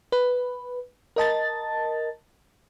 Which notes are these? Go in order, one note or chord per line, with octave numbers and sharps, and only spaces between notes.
B4
A#4 D#5 A5 A6